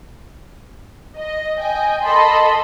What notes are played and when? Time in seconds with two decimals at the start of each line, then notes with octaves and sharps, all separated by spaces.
1.17 D#5
1.57 D#5 G5 G#5
2.03 A4 D#5 A5 B5 C6